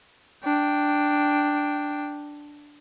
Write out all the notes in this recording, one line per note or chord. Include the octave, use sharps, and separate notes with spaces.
D4 G5